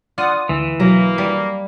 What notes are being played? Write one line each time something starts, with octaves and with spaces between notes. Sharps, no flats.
F4 D5 F#5 D#6
D2 E3
B1 F#3 A#3 A#5
G3